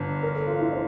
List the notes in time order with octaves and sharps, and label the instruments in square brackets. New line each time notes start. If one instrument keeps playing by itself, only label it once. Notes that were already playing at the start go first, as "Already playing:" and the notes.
Already playing: [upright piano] G1 D3
[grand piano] A#4
A4
F4
E4
C5